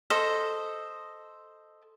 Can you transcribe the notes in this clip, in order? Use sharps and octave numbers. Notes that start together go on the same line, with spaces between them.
A4 C5 D#5